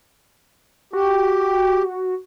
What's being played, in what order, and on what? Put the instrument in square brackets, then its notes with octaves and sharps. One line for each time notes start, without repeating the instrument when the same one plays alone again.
[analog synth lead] F#4 [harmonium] G4